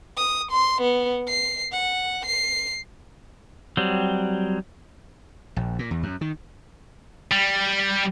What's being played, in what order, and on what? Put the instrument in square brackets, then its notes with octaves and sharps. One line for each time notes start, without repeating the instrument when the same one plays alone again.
[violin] D#6
C6
B3
C7
F#5
C7
[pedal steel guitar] F#3 G3 C4
[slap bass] A#1
A#2
E2
F#2
D#3
[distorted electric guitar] G3